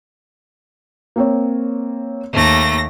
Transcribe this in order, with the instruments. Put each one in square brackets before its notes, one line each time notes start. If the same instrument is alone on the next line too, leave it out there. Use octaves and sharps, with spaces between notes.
[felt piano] A#3 C4 C#5
[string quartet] D#2 A3 A#6